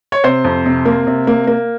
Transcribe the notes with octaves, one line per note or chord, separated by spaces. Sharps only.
C#5
C3 C5
F2
C3
A#3
C3
A#3
A#3